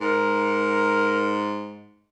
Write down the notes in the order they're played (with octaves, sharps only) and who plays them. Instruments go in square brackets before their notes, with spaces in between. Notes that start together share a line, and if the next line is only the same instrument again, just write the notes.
[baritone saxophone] G#2 [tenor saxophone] A#4